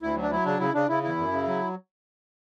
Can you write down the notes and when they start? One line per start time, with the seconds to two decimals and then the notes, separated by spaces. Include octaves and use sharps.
0.02 D2 E4
0.16 F#3
0.22 D4
0.31 F#3 E4
0.45 C#3 D4
0.60 C#3 E4
0.74 C#3 D4
0.89 C#3 E4
1.03 E2 E4
1.18 F#2
1.32 C#3
1.47 F#3